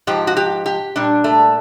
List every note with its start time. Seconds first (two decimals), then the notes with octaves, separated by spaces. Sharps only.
0.07 G#2 F3 G4
0.27 F#4
0.37 G4
0.66 G4
0.96 A#2 G3 D4
1.24 A3